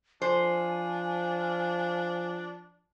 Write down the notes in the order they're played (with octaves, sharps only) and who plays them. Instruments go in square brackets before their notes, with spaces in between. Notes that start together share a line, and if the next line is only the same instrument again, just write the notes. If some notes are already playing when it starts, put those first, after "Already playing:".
[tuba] F3 [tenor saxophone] D4 [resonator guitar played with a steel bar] C5 [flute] G#5